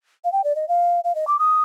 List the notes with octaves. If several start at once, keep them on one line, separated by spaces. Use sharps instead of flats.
F5
G5
D5
D#5
F5
F5
D#5
D6
D#6